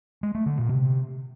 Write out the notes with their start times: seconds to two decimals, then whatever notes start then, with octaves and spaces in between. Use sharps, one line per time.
0.23 G#3
0.35 A3
0.46 D3
0.58 A#2
0.69 C3